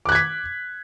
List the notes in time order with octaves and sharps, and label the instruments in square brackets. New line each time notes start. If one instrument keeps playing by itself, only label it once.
[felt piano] D6
F#6
G#6
B6